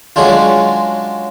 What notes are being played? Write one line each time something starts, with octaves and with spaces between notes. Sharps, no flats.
F#3 G#3 C#4 D4 F4